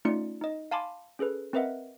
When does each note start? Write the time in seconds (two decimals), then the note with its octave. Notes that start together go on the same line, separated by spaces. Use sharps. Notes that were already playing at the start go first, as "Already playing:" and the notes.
0.05 A3 C#4 D#4 F4 D5 C#7
0.41 D#4 D#5
0.71 F5 G#5 A5 B5 C6 D6
1.19 C#4 G#4 A4 B4
1.53 C4 A#4 B4 D#5 E5 F#5